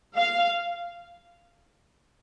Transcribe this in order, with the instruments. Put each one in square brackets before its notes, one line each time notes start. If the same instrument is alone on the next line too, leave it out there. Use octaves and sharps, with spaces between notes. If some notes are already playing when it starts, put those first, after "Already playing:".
[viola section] F5